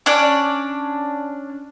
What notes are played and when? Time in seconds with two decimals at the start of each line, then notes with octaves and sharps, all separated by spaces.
0.06 C#4 D4 D5